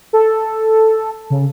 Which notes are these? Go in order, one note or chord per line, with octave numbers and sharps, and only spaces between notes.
A4
C#3